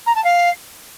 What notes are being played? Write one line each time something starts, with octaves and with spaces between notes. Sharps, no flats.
A#5
A5
F5